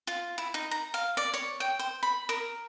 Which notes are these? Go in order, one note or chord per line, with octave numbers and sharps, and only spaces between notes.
F4
E4
D#4
A#5
F5
D5
C#5
G5
C5
B5
A#4